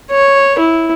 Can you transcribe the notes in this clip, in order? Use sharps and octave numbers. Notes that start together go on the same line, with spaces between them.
C#5
E4